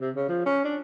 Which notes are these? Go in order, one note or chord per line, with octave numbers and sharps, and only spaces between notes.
C3
C#3
F3
C#4
D4